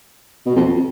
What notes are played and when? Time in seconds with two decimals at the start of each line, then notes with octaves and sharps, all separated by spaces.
0.46 B2
0.56 F2